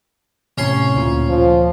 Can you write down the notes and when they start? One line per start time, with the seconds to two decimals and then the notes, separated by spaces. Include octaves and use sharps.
0.58 A2 C3 C#4 C6
0.95 D2 A#2
1.30 F3